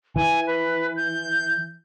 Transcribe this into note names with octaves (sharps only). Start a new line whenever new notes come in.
E3 G#5
B4
G6